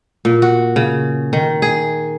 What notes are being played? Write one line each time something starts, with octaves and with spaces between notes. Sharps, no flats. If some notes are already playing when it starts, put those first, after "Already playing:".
A#2
F#4
C#3
D#3
G#4